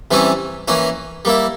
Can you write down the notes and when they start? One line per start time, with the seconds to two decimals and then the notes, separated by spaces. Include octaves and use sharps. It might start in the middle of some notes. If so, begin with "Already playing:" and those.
0.11 C3 E3 G3 C#4 E4
0.68 E3 A#3 C#4 E4
1.25 G3 A#3 E4